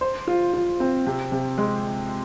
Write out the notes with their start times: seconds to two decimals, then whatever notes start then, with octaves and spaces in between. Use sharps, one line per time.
0.01 C5
0.27 F4
0.53 F4
0.80 C4
1.06 C3
1.32 C3
1.58 G#3